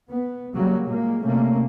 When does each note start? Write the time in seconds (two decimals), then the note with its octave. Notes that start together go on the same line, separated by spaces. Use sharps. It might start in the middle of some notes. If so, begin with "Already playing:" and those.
0.10 B3
0.54 C#3 F#3 G3 A#3
0.84 A#2 G#3 A#3
1.24 C3 A3 A#3 C#4